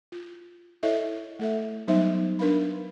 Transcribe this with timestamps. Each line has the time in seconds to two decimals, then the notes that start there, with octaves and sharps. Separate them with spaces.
0.12 F4
0.83 E4 A4 C#5 D#5 E5
1.39 A3 A4 E5
1.88 F#3 G3 B3 D#4 C5 E5
2.39 D4 A#4 B4 F5 B5